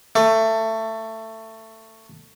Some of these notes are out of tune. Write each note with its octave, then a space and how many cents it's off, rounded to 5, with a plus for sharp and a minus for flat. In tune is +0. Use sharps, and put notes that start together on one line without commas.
A3 +20